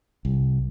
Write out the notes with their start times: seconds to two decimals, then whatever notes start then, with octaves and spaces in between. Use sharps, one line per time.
0.25 C2